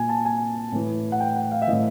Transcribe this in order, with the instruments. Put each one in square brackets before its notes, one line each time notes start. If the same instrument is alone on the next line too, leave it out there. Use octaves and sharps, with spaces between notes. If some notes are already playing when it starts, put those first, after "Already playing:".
Already playing: [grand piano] A#2 G#5
A5
G#5
A2 E3
F#5
G5
F#5
F5
E5
E3 D#5
A2